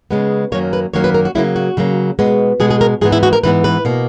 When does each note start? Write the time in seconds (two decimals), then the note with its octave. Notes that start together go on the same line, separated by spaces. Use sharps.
0.11 C#3 G#3 B3
0.52 F#2 D#3 F#3 A#3 C#5
0.73 B4
0.94 F#2 D#3 F#3 A#3 C#5
1.04 B4
1.14 A#4
1.25 F#4
1.35 C#3 F#3 A#3 E4
1.56 F#4
1.77 C#3 F#3 A#3
2.19 B2 G#3 B3
2.60 B2 G#3 B3 G#4
2.70 G#4
2.81 A#4
3.01 G#2 E3 B3 G#4
3.12 E4
3.23 F#4
3.33 A#4
3.43 G#2 E3 B3 B4
3.64 B4
3.85 B2 A#3